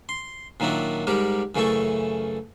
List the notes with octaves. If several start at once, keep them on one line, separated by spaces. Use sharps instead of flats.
C6
A#2 D#3 F#3 D4 E4
G#2 G3 G4 A#4 D6
F#2 C#3 E3 A3 A4 C#6